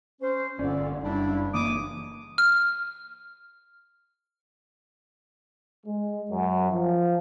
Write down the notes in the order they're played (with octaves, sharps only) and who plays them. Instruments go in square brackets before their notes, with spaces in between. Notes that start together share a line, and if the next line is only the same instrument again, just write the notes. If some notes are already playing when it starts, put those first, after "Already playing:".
[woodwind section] C#4 C5
[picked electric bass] G1 C#4 [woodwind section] A#2 D3 D5
[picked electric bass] F#1 [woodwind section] G3 D4 E4
[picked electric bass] F#1 E3 A#3 [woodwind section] D6 D#6
[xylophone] F6
[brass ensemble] G#3
F#2
F3